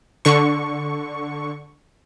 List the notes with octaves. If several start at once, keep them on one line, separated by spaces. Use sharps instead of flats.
D3 C#6